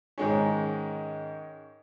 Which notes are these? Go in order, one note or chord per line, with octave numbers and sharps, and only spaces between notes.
G#2 D#3 G#3 C#4